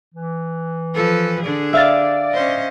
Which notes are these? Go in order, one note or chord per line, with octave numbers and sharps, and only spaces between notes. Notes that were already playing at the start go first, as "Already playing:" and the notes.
E3
F3 A4 B4
D3 D4 G#4
D5 E5 F5 A6
C#4 C5 D#5